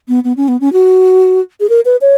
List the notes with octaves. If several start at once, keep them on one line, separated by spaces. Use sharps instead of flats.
B3
B3
C#4
B3
C#4
F#4
G#4
A#4
B4
C#5